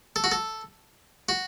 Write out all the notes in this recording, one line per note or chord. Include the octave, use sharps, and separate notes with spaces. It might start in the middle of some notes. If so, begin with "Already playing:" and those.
A4
F#4
A4
F#4